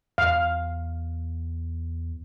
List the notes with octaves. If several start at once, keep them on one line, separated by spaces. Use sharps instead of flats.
E2 F5